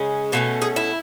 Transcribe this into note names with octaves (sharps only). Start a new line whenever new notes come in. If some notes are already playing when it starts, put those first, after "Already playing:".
Already playing: C#3 G#3 C#4
B2 A3 C#4 F#4
G#4
E4